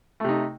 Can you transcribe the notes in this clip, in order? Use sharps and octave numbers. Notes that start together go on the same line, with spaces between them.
C3 A3 D#4